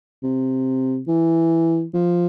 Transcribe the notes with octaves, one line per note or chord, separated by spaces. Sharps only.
C3
E3
F3